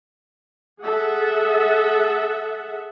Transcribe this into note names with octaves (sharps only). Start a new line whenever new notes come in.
G#4 A4 E5 F#5